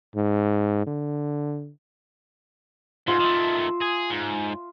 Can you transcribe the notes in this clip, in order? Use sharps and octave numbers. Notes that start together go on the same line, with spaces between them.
G#2
D3
G#2 F4 E5
D#3 A3
G#4
G#2